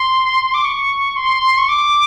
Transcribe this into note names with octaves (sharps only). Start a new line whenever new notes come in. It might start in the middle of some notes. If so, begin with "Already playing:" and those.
Already playing: C6
D6
C#6
C6
C#6
D6